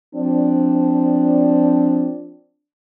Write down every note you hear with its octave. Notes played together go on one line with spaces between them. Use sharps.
F3 C4 D4